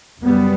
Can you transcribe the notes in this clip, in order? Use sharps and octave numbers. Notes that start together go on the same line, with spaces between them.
F#2 C#3 G3 B3